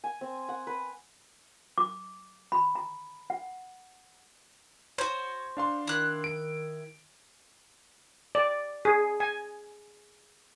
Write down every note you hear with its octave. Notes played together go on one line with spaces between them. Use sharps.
G#5
C4
F#5
B4
D6
B5
A#5
F#5
F#4 C5 C#5
D4 F5 C6
D#3 E4 F#6
D7
D5
G#4
G#5